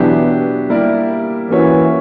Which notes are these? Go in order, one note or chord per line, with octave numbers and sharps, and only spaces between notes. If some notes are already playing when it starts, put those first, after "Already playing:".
Already playing: B2 E3 F#3 B3 D4 G4
G3 A#3 E4 A#4 D5
E3 A#3 C#4 F#4 C#5 E5